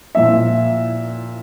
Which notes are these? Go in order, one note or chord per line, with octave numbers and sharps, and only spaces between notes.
A#2 F3 A#3 E4 E5